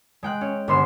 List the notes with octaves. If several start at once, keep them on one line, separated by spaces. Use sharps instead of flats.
G#3 G5 F#6
C#4
G1 B3 C6 C7 E7